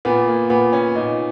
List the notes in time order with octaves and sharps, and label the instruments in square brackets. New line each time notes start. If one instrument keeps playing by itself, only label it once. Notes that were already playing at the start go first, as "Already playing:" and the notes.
[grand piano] A#2 B3
A#3
A#2 B3
C#4
A#2 D#4